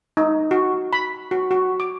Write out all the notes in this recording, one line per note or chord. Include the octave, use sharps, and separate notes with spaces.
D#4
F#4
B5
F#4
F#4
D6